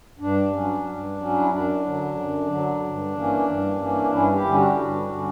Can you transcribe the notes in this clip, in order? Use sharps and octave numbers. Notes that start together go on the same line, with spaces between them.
G2 D4
F#3 C#4
G2
F#3 C#4
E4
F#2 D4
D3 F#3
F#2
D3 F#3
G2
E3 A#3 C#4
G2
E3 A#3 C#4
G2 C#4 E4
E4 G4
D3 G3 C#4
D4 F#4
G2
D3 G3 C#4